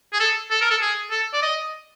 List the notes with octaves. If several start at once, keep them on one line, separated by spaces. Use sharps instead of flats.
G#4
A4
A4
A#4
A4
G#4
A4
D5
D#5